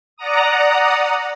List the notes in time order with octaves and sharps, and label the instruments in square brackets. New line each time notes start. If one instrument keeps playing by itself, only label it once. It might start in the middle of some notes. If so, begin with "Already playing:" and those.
[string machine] D5 F#5 A#5 D#6